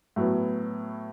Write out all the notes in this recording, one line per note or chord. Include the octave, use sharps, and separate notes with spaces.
A2 F#3 B3